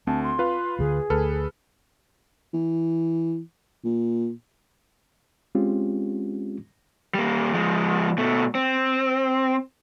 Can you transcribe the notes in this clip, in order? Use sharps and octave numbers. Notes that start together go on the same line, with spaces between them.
D2 C4 A5
C6
F4 B4 F5
D2 D3 G#4
D2 A4 B4 F6
E3
A#2
G#3 C4 C#4 F4 G4
G3 A#3
F3 G#3
B2 A3
C4